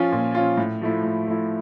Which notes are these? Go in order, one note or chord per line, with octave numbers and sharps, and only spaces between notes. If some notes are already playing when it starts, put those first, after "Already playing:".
Already playing: F3 C#4 F4
A#2
F3 C#4 F4
A2
F3 A3 E4
A2
F3 A3 E4